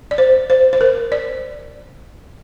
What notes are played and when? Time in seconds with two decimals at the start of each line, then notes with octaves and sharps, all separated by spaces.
0.11 D5
0.18 C5
0.50 C5
0.73 C5
0.81 A#4
1.12 D5